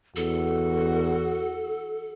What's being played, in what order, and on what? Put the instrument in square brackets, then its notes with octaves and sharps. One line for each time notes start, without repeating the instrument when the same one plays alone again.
[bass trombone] E2 [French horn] F#4 [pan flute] A4